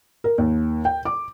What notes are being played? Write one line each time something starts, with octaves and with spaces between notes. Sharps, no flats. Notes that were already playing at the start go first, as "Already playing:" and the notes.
A#4
D#2
G5
D6